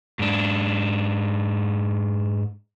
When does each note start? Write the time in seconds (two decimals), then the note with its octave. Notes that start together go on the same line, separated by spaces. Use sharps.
0.19 G#2 D4